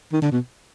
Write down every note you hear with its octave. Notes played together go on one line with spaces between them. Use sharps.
D#3
D3
B2